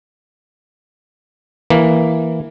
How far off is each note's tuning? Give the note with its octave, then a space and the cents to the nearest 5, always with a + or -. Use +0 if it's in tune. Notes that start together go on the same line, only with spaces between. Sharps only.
E3 -5 A#3 +0